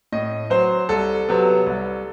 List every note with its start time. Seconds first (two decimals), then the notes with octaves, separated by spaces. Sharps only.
0.12 A2 D#5
0.50 F#3 C4 C5
0.89 C2 A4
1.29 C3 F#3 B3
1.67 C2